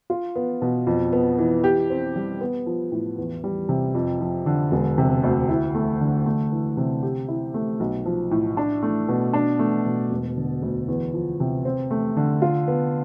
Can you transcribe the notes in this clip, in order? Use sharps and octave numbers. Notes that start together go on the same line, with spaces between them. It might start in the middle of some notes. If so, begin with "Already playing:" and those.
F4
B3
B2
F2
B3
E3
G4
C4
G3
B3
F3
A2
E2
G3
C3
F2
F3
D3
E1
C3
D2
E4
A3
D3
A3
E3
C3
G4
E4
A3
B1
F3
A2
D4
A3
B2
D4
A3
B2
E1
D3
D2
E2
F3
C3
C4
A3
D3
F4
B3